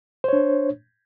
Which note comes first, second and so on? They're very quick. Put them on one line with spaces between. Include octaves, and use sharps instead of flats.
C5 C#5 D4